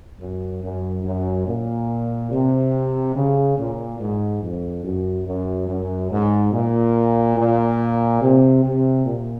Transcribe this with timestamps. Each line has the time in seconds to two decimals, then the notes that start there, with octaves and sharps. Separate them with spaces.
0.20 F#2
0.62 F#2
1.05 F#2
1.47 A#2
2.31 C3
3.15 C#3
3.58 A#2
3.99 G#2
4.42 F2
4.84 F#2
5.26 F#2
5.68 F#2
6.11 G#2
6.52 A#2
7.37 A#2
8.22 C3
8.64 C3
9.06 A#2